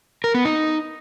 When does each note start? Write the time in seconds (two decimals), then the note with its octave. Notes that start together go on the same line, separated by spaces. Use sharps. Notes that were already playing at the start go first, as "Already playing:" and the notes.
0.24 A#4
0.34 B3
0.45 D#4